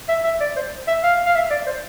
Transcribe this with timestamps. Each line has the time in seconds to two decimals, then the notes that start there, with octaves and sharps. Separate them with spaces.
0.09 E5
0.24 E5
0.41 D5
0.56 C5
0.88 E5
1.03 F5
1.26 F5
1.35 E5
1.50 D5
1.67 C5